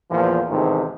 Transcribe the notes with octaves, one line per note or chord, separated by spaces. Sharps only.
E2 A#2 F3
A1 G#2 C3 D#3